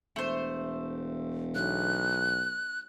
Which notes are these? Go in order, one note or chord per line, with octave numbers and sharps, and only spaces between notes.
E1 A3 C5
B1 F#6